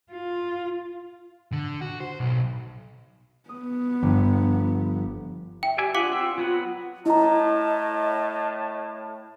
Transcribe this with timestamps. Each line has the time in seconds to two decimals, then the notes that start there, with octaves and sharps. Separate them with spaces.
0.12 F4
1.52 D3
1.81 F#4
2.00 C5
2.20 B1
3.49 B3 D#6
4.02 G1 F3
5.63 E5 G5
5.78 G4 D5 E5 G#5
5.95 D4 F4 G#4 F5 F#5 D6
6.12 C4 G5 E6
6.38 F#3 B3 F#5
7.06 A2 E4 D#5 A5 A#5